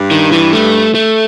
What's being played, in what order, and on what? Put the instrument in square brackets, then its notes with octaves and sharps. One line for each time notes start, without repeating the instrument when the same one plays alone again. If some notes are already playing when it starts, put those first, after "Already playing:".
Already playing: [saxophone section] G2
[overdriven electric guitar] D#3
E3
A3
A3